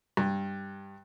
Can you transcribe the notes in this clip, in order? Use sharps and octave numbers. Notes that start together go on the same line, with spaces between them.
G2